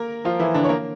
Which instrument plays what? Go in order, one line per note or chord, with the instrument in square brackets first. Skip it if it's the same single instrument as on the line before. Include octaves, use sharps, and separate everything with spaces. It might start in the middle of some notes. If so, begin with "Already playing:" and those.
Already playing: [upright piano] A#3 A#4
F3 F4
E3 E4
D3 D4
C#5
A#3 A#4